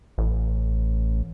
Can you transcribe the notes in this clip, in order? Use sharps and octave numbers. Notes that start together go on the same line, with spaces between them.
A1